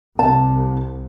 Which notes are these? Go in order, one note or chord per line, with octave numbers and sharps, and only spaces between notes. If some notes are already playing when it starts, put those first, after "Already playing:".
C2 A5